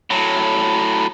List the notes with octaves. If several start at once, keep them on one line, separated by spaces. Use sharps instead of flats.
A2 F#3